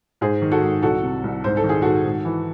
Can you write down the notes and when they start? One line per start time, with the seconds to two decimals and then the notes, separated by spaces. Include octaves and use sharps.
0.21 G#2 G#4 C5
0.42 D#3
0.51 F#4 A4
0.62 G#2
0.82 C2 F#4 A4
1.03 C3
1.24 C2
1.44 G#2 C5
1.57 A4
1.64 D#3
1.69 G#4
1.82 G#2 F#4 A4
2.06 G#2
2.25 E3